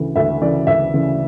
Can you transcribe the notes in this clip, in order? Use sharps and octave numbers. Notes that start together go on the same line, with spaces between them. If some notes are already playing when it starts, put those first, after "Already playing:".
Already playing: D2 C#3 E3
D2 E5
C#3 E3 D5
D2 E5
C#3 E3